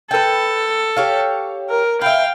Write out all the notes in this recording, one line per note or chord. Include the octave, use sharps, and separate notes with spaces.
A4 B4 G5
G4 C#5 F5
A#4
B4 E5 F5 G5